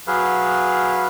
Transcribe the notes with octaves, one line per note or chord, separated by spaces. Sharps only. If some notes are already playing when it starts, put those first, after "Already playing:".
F#3 G#4 B4 F5